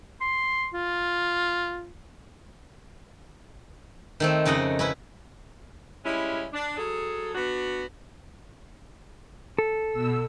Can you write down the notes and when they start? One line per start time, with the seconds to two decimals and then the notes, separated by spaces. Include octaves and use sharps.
0.21 C6
0.74 F4
4.20 D#3 A3 C4
4.45 F2 C#3 D#4 D#5 F#5
4.79 C#4 E4 B4
6.04 G3 G#3 C#4 E4
6.54 D4
6.76 F#3 G#4 A4
7.35 B3 D4 F#4
9.59 A4
9.89 B2 E6